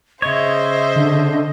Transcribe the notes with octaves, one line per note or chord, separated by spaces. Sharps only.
C#3 C5 C#5 D#5 E5
D3